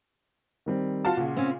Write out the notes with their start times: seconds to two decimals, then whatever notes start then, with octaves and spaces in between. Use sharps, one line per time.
0.66 D#3 G3 C4
1.05 F4 F#4 A5
1.17 A#2 C#3 F#5
1.36 C4 C#4